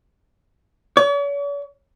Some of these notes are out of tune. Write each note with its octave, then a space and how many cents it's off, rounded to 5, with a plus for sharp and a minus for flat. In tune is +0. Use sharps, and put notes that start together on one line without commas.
C#5 +45